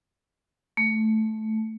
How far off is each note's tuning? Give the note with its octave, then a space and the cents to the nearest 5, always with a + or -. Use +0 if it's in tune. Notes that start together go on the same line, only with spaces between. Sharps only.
A3 -10